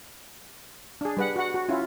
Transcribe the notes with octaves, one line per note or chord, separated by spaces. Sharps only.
D4 G#4
G3 B4 F#5
F#4 F#5
F#4
C#4 E4 F4